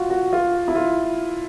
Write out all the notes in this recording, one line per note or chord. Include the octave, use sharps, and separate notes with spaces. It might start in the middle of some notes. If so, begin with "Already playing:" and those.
Already playing: F4 F#4
F#4
F4
E4
F4